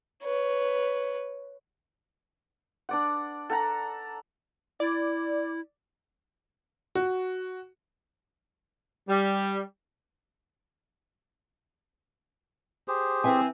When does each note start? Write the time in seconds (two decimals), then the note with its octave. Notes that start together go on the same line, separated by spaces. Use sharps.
0.24 B4 C#5
2.89 D4 D5 F#5
3.50 A4 F#5 A#5
4.80 E4 D5
6.95 F#4
9.08 G3
12.88 G4 G#4 C5
13.24 E3 C4 B4 E5 G#5